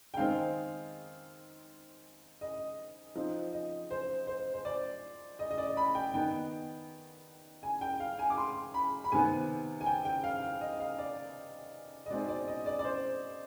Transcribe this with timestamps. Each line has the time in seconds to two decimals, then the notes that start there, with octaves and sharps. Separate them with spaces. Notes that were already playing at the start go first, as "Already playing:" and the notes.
0.14 G5
0.17 D#3 G#3 C4 D#4 F5
2.41 D#5
3.15 F3 C4 D#4
3.53 D#5
3.91 C5
4.27 C5
4.54 C5
4.65 D5
5.39 D#5
5.51 D#5
5.58 D5
5.77 B5
5.95 G5
6.14 D#3 B3 D#4 G5
7.63 G#5
7.81 G5
8.00 F5
8.19 G#5
8.30 D6
8.38 C6
8.74 B5
9.04 B5
9.12 C3 D#3 B3 G#5
9.81 G#5
9.86 G5
10.05 G5
10.24 F5
10.42 F5
10.61 D#5
10.80 F5
10.99 D5
12.06 D#5
12.10 B2 G#3 C4 D#4 D5
12.29 D5
12.48 D#5
12.66 D5
12.79 D5
12.85 C5